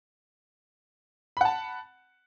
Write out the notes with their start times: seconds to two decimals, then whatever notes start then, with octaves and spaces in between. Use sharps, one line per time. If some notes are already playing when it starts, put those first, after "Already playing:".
1.37 B5
1.41 F#5
1.45 A5